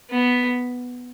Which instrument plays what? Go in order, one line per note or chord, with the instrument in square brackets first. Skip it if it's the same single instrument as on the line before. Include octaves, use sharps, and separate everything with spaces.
[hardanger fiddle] B3